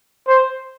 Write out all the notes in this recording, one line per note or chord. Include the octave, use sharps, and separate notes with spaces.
C5